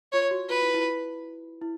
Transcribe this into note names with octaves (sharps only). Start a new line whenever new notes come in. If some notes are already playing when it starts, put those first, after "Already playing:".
F4 C#5
F#4
F4 B4
E4
E4
E4